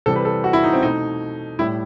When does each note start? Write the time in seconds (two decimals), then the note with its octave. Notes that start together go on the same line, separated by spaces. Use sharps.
0.06 C3 E3 G3 A4
0.16 B4
0.25 A4
0.44 F#4
0.53 E4
0.64 D#4
0.73 C4
0.83 B2 A3 D#4
1.59 A2 G3 E4